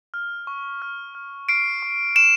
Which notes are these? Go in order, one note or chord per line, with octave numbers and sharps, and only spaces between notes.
F6
C#6
F6
F6
F6 C7 D7
C#6
C#6 D7 E7